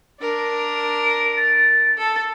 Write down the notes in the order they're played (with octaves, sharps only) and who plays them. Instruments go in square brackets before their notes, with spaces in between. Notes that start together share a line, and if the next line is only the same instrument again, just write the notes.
[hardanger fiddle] D4 A#4
[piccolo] D7
A6
[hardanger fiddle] A4